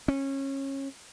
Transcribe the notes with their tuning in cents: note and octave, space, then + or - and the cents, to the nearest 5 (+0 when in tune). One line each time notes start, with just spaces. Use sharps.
C#4 -25